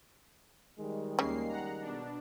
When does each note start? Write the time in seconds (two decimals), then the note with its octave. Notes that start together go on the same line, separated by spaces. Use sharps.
0.78 D#3 G3 G#3
1.19 D#2 C#3 A#3 C7
1.49 F#5 A#5
1.81 B2 D4